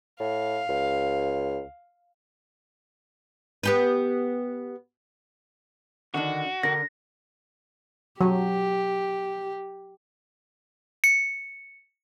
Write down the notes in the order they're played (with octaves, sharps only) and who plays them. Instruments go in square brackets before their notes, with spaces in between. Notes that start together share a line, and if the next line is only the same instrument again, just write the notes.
[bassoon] A2 [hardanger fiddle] F5
[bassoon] C#2
[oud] B3 G4 B4
[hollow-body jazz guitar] D3 D#3 D4 [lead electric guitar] F#4
[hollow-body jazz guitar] D3 A#4 [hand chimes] A#6
[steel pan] F#3 [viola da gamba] G4
[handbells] C#7